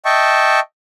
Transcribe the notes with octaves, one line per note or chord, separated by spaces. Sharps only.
D#5 E5 G5 A5 C#6